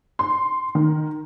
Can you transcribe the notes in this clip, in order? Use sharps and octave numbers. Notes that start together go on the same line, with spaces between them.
C6
D#3